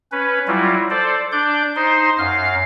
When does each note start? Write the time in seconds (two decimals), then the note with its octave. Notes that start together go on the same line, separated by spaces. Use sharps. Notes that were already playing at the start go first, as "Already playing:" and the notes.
0.12 C#4 B4
0.47 F#3 G3 E4 F4
0.90 A4 C5 D5
1.32 D4 D5 G6
1.76 D#4 C5 C6
2.18 F#2 F5 F6